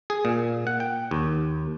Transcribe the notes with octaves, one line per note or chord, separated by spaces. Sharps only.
G#4
A#2
F#5
G5
D#2